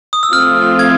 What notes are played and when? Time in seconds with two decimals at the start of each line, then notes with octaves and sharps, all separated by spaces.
0.13 D#6
0.23 E6
0.33 F3 A3 C4 F4 F6
0.79 G#6